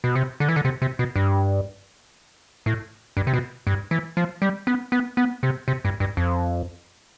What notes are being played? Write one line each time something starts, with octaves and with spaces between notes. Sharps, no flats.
B2
C3
D3
E3
D3
C3
C3
B2
G2
A2
G2
C3
B2
G2
E3
F3
G3
B3
B3
B3
C3
C3
G2
G2
F2